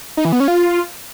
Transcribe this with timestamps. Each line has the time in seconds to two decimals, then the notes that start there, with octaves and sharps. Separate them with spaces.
0.17 D#4
0.25 E3
0.33 B3
0.40 C#4
0.48 F4